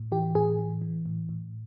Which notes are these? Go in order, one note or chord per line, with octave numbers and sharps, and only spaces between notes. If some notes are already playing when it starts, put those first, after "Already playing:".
Already playing: A2
E3 G4
A2 G#4
E3
E3
A2
A2